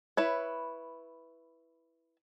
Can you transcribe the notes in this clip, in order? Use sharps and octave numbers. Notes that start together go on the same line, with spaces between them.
E4 B4 C#5